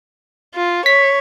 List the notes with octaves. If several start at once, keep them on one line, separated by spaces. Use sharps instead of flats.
F4
C#5 B6